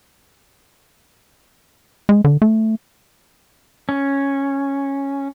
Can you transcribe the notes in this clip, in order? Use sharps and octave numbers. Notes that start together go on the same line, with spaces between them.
G#3
D3
A3
C#4